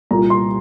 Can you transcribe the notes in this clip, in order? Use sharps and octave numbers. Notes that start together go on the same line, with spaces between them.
C2 A#2 A#5
C6